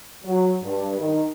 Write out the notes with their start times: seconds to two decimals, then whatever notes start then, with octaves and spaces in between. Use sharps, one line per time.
0.24 F#3
0.61 G2
0.98 D#3